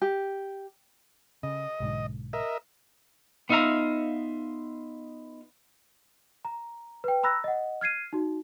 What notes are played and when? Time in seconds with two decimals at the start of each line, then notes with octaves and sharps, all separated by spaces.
0.02 G4
1.43 C#3 D#5
1.80 B1 G#2 D3
2.33 A#4 D#5 E5
3.49 B3 D#4 F4 E5 F5 A#5
6.45 A#5
7.04 B4 G5
7.23 A#5 B5 E6 F#6 A#6
7.44 D#5 F#5
7.81 F6 G#6 C7 D#7
8.13 D#4 F#4